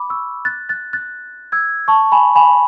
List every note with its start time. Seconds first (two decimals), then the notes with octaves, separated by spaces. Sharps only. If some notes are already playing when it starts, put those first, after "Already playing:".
Already playing: B5 D6
0.10 C#6 E6
0.45 F#6 A6
0.69 F#6 A6
0.93 F#6 A6
1.52 E6 G#6
1.88 A5 C#6
2.12 G#5 B5
2.36 G#5 B5